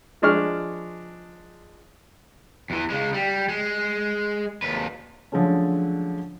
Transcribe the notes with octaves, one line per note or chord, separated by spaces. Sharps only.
F3 G#3 D4 C#6 F6
E2 E3
C#3 G#3
G3
G#3
D#2 B4
D3 F3 F#3 G#3 A3 C#4